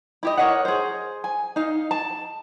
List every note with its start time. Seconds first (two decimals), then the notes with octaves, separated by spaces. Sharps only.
0.23 E4 G4 D#5
0.37 A#4 C#5 D#5 F#5
0.65 G#4 C5
1.24 G#5
1.56 D#4 F5
1.91 A5